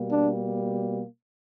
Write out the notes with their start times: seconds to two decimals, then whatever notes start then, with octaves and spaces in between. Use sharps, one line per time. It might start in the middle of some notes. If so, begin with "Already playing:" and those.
Already playing: B2 G3 A#3
0.10 D4